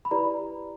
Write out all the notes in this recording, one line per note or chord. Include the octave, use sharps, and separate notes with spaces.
B5
E4 G4 B4 D5 A#5